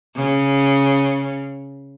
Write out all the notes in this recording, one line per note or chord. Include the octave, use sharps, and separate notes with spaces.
C#3